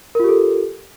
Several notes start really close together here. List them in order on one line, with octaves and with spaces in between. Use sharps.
A#4 F4 G4 A4